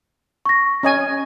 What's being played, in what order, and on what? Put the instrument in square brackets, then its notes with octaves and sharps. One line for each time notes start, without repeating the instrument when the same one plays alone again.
[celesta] C#6 A#6
[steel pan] C#4 D#5 G#5